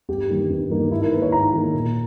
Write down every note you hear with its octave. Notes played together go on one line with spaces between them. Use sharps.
G2 G4
D#3 G3 A#3 D#4
G2
D#3 G3 A#3 D#4
G#2 E4
A#4
D#3 A#3 B4
C#5
G#2 A#5
D#3 A#3
A#2